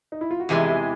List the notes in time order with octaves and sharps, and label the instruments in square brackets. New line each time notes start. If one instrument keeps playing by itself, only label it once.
[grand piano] D#4
E4
F4
F#4
[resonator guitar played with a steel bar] E2 C3 E3 G#3 [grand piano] G4
[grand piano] G#4